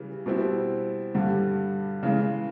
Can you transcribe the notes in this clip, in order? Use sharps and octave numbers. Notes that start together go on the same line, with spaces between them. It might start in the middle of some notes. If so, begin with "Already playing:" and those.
Already playing: C#3 E3 G3
B2 G3 C4 E4
G2 D3 G3
C#3 E3 G#3